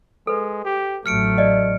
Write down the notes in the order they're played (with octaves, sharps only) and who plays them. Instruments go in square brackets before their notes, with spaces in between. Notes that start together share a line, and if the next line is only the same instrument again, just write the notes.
[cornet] G#3 [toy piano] A4 B4
[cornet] G4
[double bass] A1 F#3 [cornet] A3 [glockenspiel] F6 C#7 D7
[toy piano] D5 D#5